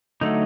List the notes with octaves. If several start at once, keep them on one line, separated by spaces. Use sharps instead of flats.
D3 F#3 A3 D#4